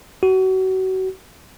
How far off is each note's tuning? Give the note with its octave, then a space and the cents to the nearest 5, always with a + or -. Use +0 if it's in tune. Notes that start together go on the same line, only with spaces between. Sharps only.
F#4 +30